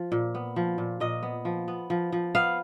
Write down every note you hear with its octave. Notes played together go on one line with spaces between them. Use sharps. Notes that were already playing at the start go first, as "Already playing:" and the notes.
Already playing: F3
A#2
B3
F3
A#2
A#2 D#5
B3
F3
B3
F3
F3
B3 F5